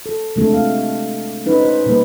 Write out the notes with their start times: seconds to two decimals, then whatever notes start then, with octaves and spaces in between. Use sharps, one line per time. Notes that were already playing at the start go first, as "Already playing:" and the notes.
0.06 A4
0.36 C3 G#3 A3 D4 A4
0.52 A3 F5
1.46 C#4 D#4 B4
1.62 C5
1.86 B2 G3 A#3 A#4 B4